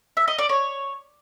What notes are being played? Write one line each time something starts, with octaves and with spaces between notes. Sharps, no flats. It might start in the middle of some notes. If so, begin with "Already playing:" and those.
E5
D#5
D5
C#5